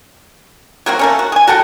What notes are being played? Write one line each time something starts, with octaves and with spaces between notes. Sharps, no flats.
F#3 A#3 C4 F#4
A3 A#3 C#4
F#4
G#4 G#5
F#4 A4 F#5 G5